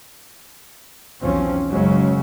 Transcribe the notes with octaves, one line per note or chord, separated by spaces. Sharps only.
B1 E2 F3 C4 C#4
F#1 C#3 F#3 G#3 C#4